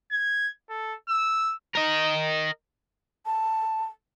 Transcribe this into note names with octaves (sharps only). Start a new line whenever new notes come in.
G#6
A4
E6
A#4 D#5
A5